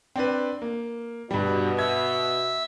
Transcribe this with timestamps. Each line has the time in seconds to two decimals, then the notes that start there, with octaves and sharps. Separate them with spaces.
0.16 C4 D4 B4
0.62 A#3
1.31 G2 B2 G3
1.79 E5 G#6